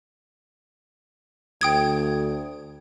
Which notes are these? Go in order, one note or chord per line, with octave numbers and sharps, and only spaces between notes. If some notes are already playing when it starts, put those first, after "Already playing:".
D2 G5 D#6 G#6